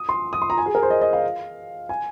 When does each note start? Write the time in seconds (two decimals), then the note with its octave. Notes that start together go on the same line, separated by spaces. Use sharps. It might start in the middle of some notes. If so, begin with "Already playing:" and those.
Already playing: D#6
0.09 C6
0.33 D#6
0.42 C6
0.50 A#5
0.58 G#5
0.66 G#4
0.75 A#4
0.83 C5
0.90 D#5
1.01 D#5
1.13 F5
1.89 G#5